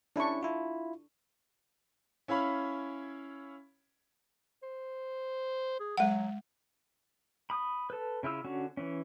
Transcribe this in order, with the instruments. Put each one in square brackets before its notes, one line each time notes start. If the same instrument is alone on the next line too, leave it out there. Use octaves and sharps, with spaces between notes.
[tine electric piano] C#4 E4 [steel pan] D4 C#6
[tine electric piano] E4 F4
[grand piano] C#4 E4 C#5 F5 B5
[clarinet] C5
G#4
[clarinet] F#3 [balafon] G#3 F#5
[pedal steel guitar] B5 D#6
A4 B4
C#3 E4 F4 E6
D3 C#4 F#4
E3 C#4